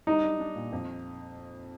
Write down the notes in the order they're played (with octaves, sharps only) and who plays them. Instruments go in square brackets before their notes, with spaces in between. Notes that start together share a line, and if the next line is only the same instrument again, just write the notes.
[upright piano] G3 [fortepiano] D#4
[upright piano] D4
D4
A#2
F2